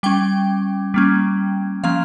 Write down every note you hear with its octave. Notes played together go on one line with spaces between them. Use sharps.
G3 C#4 G5
G3 A#3 C#4
F3 A#3 C#4 F5